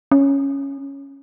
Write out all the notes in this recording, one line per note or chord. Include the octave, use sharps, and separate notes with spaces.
C#4